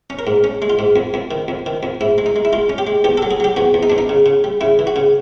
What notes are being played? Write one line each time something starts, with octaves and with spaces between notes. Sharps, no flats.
C#4
A#4
G#2
C#4
G#3
F4
G#2
F2
F2
D#3
F2
D#3
F2
G#2 E4
G#3
D#4
G#3
E4
G#3 F4
C#4
G4
G#3
E2 G4
A4
F#3
G#4
F#3 G4
E2 F#4
E2
D#4
E2 D4
D#4
C#3
C#3
G3
C#3 E4
E3
F#4
C#3